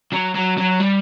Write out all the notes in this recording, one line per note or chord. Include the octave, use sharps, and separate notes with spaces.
F#3
F#3
F#3
G3